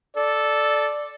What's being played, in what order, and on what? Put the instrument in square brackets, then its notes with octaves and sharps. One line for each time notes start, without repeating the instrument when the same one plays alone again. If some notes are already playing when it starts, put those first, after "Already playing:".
[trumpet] A4 [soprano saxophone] D5